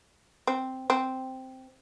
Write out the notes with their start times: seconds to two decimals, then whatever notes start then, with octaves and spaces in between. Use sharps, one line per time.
0.47 C4
0.90 C4